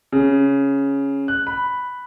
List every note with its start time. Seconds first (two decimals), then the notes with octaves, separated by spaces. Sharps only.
0.12 C#3
1.28 F#6
1.47 B5